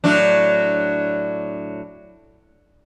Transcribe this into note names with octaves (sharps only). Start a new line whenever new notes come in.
A2 F#3 D4